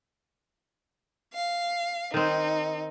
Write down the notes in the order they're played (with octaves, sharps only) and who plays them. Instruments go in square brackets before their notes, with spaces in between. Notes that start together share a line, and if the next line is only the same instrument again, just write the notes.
[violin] F5
[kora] D#3 C4 [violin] D#4